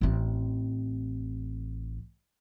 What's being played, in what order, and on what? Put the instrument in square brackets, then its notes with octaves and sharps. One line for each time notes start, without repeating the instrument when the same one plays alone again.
[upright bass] A1 C4